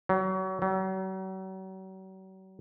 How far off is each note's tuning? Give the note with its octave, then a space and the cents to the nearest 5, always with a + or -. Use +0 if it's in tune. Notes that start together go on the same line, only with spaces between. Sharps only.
F#3 +30
F#3 +40